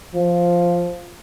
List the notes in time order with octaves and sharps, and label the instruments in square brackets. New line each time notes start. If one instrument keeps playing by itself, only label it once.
[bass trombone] F3